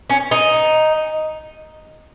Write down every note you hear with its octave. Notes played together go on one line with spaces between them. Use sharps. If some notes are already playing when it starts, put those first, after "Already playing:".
C#4
D#4